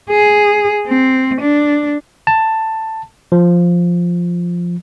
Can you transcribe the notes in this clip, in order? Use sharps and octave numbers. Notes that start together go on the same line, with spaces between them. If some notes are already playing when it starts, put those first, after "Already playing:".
G#4
C4
D4
A5
F3